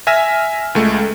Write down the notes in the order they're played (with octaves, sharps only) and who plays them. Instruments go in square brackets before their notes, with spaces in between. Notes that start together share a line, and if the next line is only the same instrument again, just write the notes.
[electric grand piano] E5 G#5 F6 A#6 E7
C#2 G#3 A3